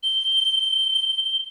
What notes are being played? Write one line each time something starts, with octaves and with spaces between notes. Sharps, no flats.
G7